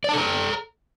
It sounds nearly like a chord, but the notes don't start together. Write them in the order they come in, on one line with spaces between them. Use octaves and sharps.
D5 A5 A4 A#5